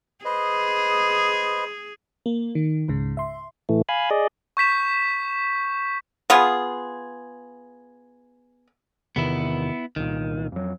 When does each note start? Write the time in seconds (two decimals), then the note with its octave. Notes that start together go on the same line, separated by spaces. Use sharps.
0.25 G#4 B4 C5 D#5
2.26 A#3
2.55 D#3
2.88 C#2 G#2 C#3
3.17 E5 C6
3.69 A2 E3 A3
3.89 F5 G#5 B5
4.10 G#4 D5 D#5
4.57 C#6 G6 B6 E7
6.30 B3 F4 G#4
9.16 E2 C3 D#3 B3 E4
9.96 C2 A#2 D#3
10.52 F2 F#3